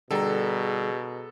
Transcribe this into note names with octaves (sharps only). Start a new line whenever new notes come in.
B2 D3 G3 G#4 A4 A#5